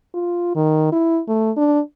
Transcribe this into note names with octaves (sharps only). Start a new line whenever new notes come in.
F4
D#3
E4
A3
D4